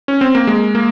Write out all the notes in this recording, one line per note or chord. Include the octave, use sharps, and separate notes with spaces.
C#4
C4
A#3
G#3
A#3